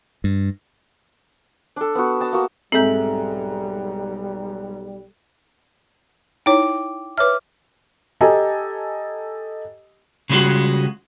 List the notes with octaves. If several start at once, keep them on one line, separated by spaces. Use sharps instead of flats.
G2
D4 A4
B3 F#4
D#5 A5 D#6
A#3 F#4
B1 G#2 G3 G#3 C4 A4 E5 G6
D#4 E4 C#5 G5 D6
B4 C#5 E5 D6 F6
G4 A4 D#5 G#5 A#5
C#3 G3 G#3 A#3 F4 F#4